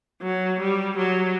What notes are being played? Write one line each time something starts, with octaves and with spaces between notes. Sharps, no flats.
F#3
G3
F#3